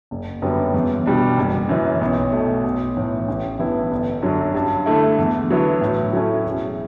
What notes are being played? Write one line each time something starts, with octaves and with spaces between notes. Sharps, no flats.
F#1
F#2 D3 G3 B3
E2
B2 G3 D4
F#1
F#2 E3
B1
B2 A3
B1
A2 E3
A1
G2 E3 B3 E4
G1
F#2 D3 F#3
G2
D3 A3 E4
E2
D3 F#3 B3 E4
A2
F#3 A3 C#4 E4
E1